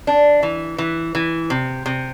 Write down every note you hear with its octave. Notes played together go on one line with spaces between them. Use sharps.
D4
E3
E3
E3
C3
C3